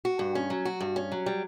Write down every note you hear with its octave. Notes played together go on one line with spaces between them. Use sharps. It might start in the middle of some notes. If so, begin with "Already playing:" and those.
F#4
G2
C#4
F#3
F#4
G2
C#4
F#3
G3